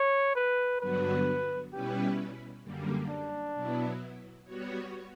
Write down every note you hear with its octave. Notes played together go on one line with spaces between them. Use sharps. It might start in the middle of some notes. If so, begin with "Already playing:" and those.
Already playing: C#5
B4
G2 D3 F#3 B3 F#4 B4
B2 G3 C#4 E4 G4 B4
F#2 D3 G3 A#3
D4
B2 F#3 B3 E4
G3 B3 F#4 C#5